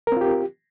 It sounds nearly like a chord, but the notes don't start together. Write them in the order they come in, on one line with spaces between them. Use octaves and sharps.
A#4 C4 F4 G4